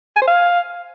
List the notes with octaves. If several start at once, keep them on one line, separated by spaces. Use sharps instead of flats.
G#5
C5
F5